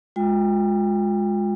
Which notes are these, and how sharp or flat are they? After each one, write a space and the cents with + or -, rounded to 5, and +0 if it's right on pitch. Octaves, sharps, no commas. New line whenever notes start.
G#3 +0 F4 +30 G5 +25